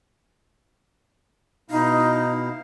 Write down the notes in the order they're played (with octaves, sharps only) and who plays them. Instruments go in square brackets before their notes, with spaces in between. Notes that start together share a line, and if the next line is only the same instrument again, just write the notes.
[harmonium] B2 E4 F5 [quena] D#4